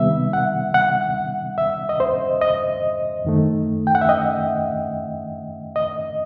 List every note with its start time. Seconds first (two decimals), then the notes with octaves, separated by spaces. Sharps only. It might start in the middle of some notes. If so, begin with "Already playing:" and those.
Already playing: C3 D#3 G3 B3 E5
0.33 F#5
0.74 F#5
1.58 E5
1.89 D#5
2.00 C5
2.42 D#5
3.25 F#2 D#3 A3
3.87 G5
3.95 F#5
4.01 E5
4.09 D#5
5.76 D#5